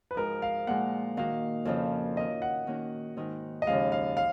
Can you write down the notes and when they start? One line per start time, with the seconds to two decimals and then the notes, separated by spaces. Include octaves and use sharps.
0.11 B4
0.14 G#2 F3 G#3 D#4 F#4 A#4
0.42 F5
0.67 A#2 F3 G#3 F#5
1.17 D#3 A#3 D#4 F#4 F5
1.65 F2 C#3 F3
2.17 D#3 A#3 F4 D#5
2.42 F#5
2.67 D#3 A#3 C#4 F#4
3.17 G#2 D#3 G#3
3.62 D#5
3.67 D#2 C#3 F3 G#3 F5
3.92 F5
4.17 F5